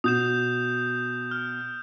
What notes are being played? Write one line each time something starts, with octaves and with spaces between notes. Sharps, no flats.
B2 D#6 G6 E7
F6